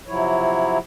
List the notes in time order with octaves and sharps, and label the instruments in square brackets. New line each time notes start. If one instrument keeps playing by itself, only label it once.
[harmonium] C3 F3 F#3 E4 C#5